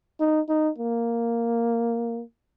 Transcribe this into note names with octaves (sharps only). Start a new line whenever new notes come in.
D#4
D#4
A#3